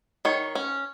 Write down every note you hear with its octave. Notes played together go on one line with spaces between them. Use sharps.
D#3 C#5
C#4